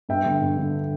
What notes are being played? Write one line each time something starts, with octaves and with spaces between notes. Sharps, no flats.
G2 E5 G5
D3
G2
D3